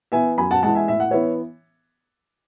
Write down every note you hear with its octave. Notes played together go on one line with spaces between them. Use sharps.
E3 B3 E5 G#5
F#2 G#5 B5
F#5 A5
E3 G#3 F#5 A5
E5 G#5
A2 E5
F#5
E3 B3 C#5 E5